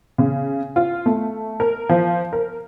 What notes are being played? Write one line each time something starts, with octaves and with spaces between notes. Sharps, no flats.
C#3
F4
A3
A#4
F3
A#4